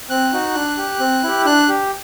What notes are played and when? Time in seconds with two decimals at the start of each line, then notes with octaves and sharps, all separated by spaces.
0.09 C4 F#6
0.32 D#4 F#4
0.55 D4
0.77 G4
1.00 C4
1.23 E4 G4
1.45 D4 F#6
1.69 G4